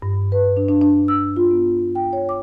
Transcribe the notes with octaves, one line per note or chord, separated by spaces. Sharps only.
G2
B4
D4
D4
D4
E6
F4
B3
G5
C#5
D6